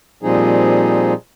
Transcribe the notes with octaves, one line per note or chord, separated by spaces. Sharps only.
A#2 F3 G3 C4 D#4 G#4